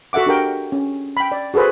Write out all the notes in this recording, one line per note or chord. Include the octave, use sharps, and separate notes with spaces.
F#4 A4 E5 F#5 D6
D4 G4 A#4 G5
C#4
G5 B5
D5
F#4 G#4 A4 B4 C5